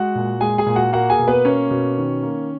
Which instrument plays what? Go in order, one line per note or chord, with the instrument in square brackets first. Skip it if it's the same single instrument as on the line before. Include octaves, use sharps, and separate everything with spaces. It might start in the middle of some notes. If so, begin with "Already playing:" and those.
Already playing: [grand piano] G#3 F#4 F#5
A#2
G#3 G#4 G#5
G#4 G#5
A#2
F#4 F#5
A#3 F#4 F#5
G#4 G#5
B2
B3 B4
A#3 C#4 C#5
B2
D#3
A#3